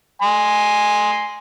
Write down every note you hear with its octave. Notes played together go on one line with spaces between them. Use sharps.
G#5 C6